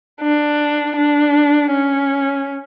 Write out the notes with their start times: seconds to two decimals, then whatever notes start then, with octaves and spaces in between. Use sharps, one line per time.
0.21 D4
0.97 D4
1.71 C#4